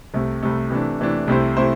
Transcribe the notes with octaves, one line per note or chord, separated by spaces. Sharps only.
C2 C3 A3
C2 C3 A3
C3 E3 A3 D4
C3 E3 A3 D4
C2 C3 A3 E4 C5
C3 A3 E4 C5